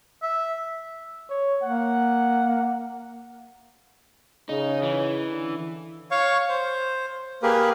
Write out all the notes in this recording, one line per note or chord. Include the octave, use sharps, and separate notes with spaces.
E5
C#5
A#3 F#5
C#3 D#4
E3
D3
C#5 F5 C#6
C5
A#3 G4 G#4 A#4 B4